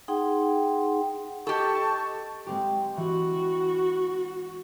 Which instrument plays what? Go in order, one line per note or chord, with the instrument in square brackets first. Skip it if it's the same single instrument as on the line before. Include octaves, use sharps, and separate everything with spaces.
[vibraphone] D#4 G#4 F#5 G5 C6
[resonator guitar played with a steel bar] G4 A4 [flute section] D#5 A5 C#6
[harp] G#3 C4 G4
[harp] E3 [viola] F#4